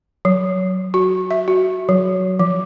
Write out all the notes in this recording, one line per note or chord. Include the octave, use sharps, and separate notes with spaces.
F#3
F#4
E5
F#4
F#3
F3